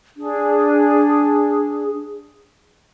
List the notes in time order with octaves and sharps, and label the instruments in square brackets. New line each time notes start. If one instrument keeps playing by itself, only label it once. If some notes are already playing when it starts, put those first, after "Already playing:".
[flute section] D4 G#4